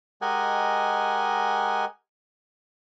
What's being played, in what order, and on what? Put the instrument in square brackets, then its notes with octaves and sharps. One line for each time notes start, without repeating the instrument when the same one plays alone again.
[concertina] G#3 G4 A#4 D#5 F#5 G#5